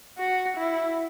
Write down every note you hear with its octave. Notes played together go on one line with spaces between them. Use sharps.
F#4
E4